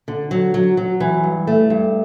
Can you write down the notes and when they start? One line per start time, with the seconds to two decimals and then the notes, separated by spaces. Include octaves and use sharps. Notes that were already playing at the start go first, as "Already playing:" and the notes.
0.08 D3
0.31 F#3
0.54 F#3
0.77 F#3
1.00 E3
1.24 G2
1.47 A3
1.70 G2